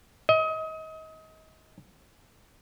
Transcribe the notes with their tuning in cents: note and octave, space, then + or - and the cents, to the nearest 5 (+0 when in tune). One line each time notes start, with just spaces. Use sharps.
D#5 +30